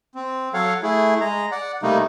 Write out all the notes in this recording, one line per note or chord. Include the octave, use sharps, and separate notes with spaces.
C4
F#3 A4 C#5 F5 F#5
A3 E4 G#4
G#3 A#5
D5 F#5
C3 G3 A3 A#3 D#4